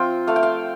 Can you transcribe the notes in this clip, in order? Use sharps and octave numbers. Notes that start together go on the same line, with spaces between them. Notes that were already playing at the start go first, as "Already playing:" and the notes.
Already playing: F3 C4 F4 G5
A3 F5
G5
F5